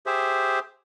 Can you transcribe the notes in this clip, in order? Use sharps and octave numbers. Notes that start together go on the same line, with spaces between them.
G4 G#4 C5 E5